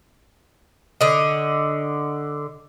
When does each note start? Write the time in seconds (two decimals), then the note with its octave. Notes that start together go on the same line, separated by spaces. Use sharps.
1.01 D3 D#5